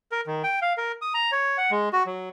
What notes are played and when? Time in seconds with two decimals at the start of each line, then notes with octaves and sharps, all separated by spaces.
0.12 A#4
0.27 D#3
0.44 G5
0.62 F5
0.77 A#4
1.02 D#6
1.14 A#5
1.32 C#5
1.58 F#5
1.71 G#3
1.93 F#4
2.06 F#3